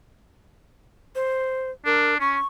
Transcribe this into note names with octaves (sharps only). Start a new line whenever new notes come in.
C5
D4 A#4
C#4 C#6